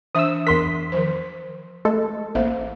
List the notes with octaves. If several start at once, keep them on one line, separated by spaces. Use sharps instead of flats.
E3 D4 E5 D#6 E6
E2 A#4 C6 B6
D#3 F3 C5
G#3 A3 A4
A1 A#3 C5 E5